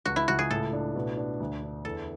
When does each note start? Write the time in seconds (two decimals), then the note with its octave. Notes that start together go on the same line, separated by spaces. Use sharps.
0.05 C#2 F#4
0.16 E4
0.28 C#2 F#4
0.39 G#4
0.50 A2 A4
0.73 D4
0.95 B2
1.17 D4
1.40 D2
1.63 D4
1.85 E2 A4